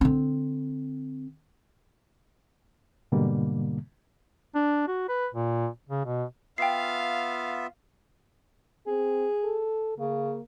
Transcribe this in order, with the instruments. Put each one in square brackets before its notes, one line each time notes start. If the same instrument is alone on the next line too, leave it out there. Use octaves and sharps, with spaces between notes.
[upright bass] D3 C4
[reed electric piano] G#2 B2 D3 G3 A#3
[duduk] D4
F#4
B4
A#2
C#3
B2
[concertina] B3 F4 E5 [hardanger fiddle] F5 [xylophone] G5 C7
[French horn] C4 [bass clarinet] G#4
[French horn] A4
[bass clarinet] C#3 [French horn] A#3